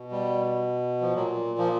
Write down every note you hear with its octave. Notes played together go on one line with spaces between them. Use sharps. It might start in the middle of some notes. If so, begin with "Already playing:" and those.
Already playing: B2
G3
F3
A#2 F#3
F3